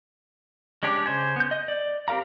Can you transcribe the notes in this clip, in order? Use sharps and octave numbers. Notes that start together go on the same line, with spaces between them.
G#3 C#4 D4 G4
C#3 C5 G#5
B3 G6
D#5
D5
C4 G4 A#4 F5 A#5